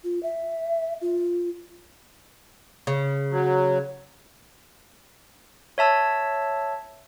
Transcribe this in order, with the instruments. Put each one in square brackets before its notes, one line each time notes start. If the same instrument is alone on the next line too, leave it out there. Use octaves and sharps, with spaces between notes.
[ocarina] F4
E5
F4
[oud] C#3
[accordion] F#3
[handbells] C#5 E5 A5 E6